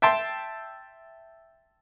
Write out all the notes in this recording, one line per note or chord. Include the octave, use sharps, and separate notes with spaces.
E5 G5 A5 C6